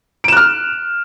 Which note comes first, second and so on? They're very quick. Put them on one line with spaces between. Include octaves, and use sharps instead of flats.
D7 E7 F#6 F6